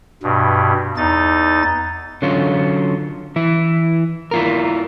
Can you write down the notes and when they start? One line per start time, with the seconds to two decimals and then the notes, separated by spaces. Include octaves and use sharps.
0.23 G2 B2
0.97 E2 D#4 A6
2.22 D3 F#3 C#4 F4
3.36 E3 E4
4.31 E4 F4 A#4